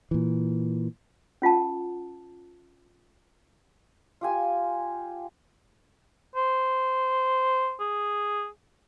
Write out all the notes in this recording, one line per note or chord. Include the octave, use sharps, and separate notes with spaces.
A#2 E3
C#4 F4 F#5 A5
F4 G4 G#5
C5
G#4